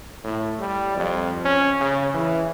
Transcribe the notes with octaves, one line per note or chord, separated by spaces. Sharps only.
A2
G3
F2
C#4
C#3
E3